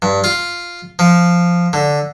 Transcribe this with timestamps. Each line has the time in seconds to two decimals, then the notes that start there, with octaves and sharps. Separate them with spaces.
0.02 G2
0.24 F4
0.99 F3
1.73 D3